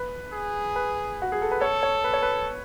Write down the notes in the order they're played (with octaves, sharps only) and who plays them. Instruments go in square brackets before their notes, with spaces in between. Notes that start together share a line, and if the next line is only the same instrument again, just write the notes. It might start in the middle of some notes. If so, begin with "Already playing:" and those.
Already playing: [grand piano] B4
[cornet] G#4
[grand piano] B4
F#4
G#4
A4
B4
[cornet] A4 [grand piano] C#5
[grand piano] C#5
B4
C#5
B4